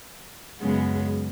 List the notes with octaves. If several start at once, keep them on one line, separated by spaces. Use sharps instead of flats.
F#2 C#3 G#3 B3